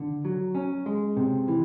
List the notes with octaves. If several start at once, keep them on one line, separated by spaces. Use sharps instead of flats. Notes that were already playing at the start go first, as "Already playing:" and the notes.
Already playing: D3
F#3
C#4
G#3
C3
E3